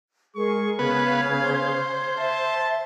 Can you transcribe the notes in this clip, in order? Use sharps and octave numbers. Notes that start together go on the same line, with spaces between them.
G#3 G#4 A#4 C#6
C#3 B3 B4 F5 G#6
C5
E5 A5